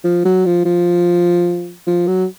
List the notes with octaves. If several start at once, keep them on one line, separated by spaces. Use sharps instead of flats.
F3
F#3
F3
F3
F3
F#3